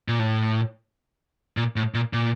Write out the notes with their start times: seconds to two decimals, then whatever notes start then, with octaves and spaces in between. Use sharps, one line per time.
0.08 A#2
0.19 A2
1.57 A#2
1.76 A2
1.94 A#2
2.13 A#2